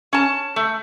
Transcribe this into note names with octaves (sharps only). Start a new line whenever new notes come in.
C#4 A5
A3